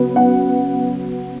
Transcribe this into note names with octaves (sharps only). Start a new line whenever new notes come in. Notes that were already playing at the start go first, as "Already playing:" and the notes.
Already playing: C#3 F#3 B3
F#5